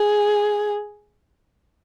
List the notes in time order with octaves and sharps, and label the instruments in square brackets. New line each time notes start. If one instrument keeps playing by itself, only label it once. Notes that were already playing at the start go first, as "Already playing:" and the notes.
Already playing: [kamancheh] G#4